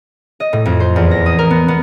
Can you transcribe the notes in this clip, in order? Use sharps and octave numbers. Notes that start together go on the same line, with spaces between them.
D#5
A2
F2
C5
E2
A#6
D#6
A#4
B3
B3